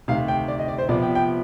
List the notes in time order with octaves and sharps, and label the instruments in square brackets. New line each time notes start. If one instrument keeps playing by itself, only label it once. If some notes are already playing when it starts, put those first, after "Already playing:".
[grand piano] D2 C3 D#3 F5
G5
D5
D#5
D5
C5
C3 F3 B3 D5
G5
G5